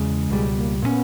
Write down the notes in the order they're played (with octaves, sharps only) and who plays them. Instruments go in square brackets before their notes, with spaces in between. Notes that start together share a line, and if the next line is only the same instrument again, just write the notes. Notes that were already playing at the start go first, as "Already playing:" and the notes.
Already playing: [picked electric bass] E2 C#3 G#3
[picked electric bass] C#2 B2 G3 [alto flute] G#3
[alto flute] A#3
[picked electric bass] A#2 G#3 C#4 [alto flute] B3